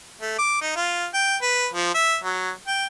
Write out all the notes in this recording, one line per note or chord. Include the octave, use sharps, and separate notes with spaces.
A3
D6
D#4
F4
G5
B4
F3
E5
F#3
G5